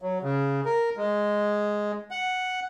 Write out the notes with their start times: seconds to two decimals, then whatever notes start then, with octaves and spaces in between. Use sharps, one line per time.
0.02 F#3
0.22 C#3
0.65 A#4
0.97 G#3
2.11 F#5